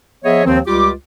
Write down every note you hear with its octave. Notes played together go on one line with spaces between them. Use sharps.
F3 B3 G#4 C#5 D#5 E5
D#2 D#3 F3 C4
C#2 G3 F4 G4 D6